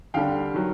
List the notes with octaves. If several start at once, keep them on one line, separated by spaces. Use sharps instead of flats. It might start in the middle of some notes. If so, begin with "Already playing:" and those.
D#2 D3 G3 F5 G5
D#3 F#3